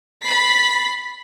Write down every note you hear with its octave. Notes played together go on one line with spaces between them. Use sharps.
B5 A6 B6 C7